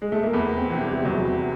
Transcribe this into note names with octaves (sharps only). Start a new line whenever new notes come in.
G#3
A3
A#3
E2 B3
C4
C3 E3
G3
G3
E2 F#3